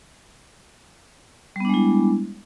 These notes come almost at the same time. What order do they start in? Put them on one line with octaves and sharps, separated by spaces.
G3 B3 D4 G#3 E4